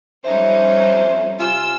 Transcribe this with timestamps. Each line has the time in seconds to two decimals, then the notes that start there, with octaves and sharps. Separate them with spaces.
0.25 F2 G3 C#4 D#4 C5 E5
1.39 C3 F4 G#5 E6